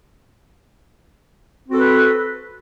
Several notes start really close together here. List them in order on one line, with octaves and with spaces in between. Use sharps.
C4 F#4 A4 B4